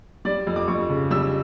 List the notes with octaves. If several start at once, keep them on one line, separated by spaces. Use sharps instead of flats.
G3 D5
F2
D6
F2 C#6
C#3
G3 E6